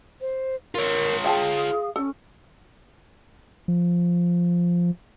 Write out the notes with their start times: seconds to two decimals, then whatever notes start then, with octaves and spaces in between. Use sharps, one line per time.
0.21 C5
0.75 F4 A#4 C#5
1.24 G#4 E5 F5 G5 A5
1.96 C#4 A4
3.68 F3